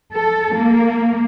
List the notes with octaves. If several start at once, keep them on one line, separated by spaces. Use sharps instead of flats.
A4
A#3